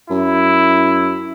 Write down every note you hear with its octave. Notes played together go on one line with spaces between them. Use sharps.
F#2 E4